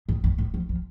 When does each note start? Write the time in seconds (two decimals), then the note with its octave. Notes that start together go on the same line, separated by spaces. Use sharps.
0.09 G#2
0.24 G2
0.38 G#2
0.54 F3
0.69 F3